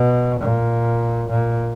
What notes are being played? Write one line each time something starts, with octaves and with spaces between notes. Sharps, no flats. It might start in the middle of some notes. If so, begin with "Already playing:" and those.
Already playing: B2
A#2
A#2